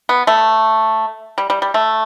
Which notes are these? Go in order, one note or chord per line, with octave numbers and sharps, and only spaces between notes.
B3
A3
G3
G3
G3
A3